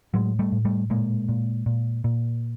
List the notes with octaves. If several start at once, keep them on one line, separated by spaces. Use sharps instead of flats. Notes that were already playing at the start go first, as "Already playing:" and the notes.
A2 F#3 G#3
G3 A3
A2
G3 A3
A#2 G#3 A#3
A#2
A#2
A#2